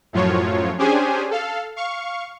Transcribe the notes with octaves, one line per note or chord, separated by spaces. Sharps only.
F#2 A2 F3 F#3 F4 C#5
C#4 D4 G4 G#4 C5 G#5
A4 F5
F5 C#6